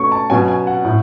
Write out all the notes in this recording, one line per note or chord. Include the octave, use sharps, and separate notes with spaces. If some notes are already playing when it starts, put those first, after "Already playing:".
Already playing: B2 A3 C#4 C#6
A5
B2 F#3 C#4 G#5
G#5
F#5
A2